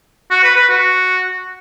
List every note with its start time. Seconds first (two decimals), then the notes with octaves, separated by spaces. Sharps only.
0.31 F#4
0.44 B4
0.56 B4
0.69 F#4